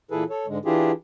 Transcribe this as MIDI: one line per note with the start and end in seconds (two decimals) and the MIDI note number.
0.11 0.24 46
0.11 0.24 52
0.11 0.24 64
0.11 0.24 68
0.11 0.24 69
0.11 0.24 71
0.30 0.46 69
0.30 0.46 73
0.47 0.58 44
0.47 0.58 50
0.47 0.58 56
0.65 0.92 52
0.65 0.92 62
0.65 0.92 64
0.65 0.92 65
0.65 0.92 67
0.65 0.92 68